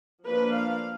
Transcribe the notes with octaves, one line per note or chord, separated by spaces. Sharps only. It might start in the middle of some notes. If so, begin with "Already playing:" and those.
F3 A#3 D4 B4
F5